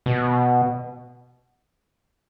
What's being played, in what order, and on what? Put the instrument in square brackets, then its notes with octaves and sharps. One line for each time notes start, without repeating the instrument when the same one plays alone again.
[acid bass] B2